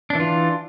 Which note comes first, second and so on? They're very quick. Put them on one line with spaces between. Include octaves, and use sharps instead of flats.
D4 E3 F4